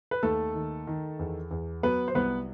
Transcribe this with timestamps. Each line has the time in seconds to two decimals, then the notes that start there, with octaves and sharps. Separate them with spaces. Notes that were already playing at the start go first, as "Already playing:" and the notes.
0.11 B4
0.23 D#2 A3 A4
0.55 D#3
0.87 D#3
1.19 E2
1.51 E2
1.83 F#3 B3 B4
2.08 C5
2.15 C2 B3 B4